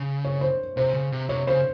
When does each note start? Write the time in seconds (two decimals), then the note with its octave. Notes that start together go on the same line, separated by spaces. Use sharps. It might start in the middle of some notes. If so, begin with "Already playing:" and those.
Already playing: C#3
0.25 C#5
0.41 C5
0.77 C3 C5
0.94 C#3
1.12 C3
1.29 C3 C#5
1.47 C#3 C5